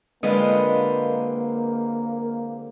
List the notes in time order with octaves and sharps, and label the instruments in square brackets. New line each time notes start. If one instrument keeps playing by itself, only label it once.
[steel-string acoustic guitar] D3 G#3 C4 [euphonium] A#3 [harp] F4 B4 D#5